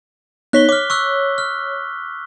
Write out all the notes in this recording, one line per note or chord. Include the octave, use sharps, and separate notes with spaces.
B3 D#4 C#5 F#6 B6 G7
C#5 D6 F6
C#6 E6 F#6
F6